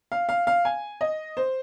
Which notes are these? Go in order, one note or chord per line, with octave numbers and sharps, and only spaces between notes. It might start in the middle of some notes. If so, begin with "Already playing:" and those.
F5
F5
F5
G#5
D#5
C5